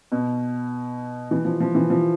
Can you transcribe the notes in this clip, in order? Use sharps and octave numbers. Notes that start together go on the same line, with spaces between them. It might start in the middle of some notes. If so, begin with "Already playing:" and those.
B2
E3
F3
F3
E3
F3